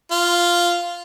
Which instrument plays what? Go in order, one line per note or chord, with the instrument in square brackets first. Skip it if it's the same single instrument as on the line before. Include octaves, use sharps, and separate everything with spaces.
[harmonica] F4